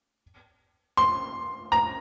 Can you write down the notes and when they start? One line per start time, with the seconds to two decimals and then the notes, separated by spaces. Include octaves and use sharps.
0.97 C6
1.72 A#5